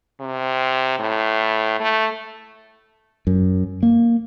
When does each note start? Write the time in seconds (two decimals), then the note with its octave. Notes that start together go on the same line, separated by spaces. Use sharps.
0.21 C3
1.00 A2
1.80 A3
3.27 F#2
3.83 A#3